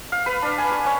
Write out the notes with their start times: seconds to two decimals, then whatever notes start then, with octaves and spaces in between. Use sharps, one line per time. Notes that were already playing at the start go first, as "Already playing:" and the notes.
0.12 F5
0.26 B4
0.42 D4
0.58 G#5
0.72 C#6
0.86 C#4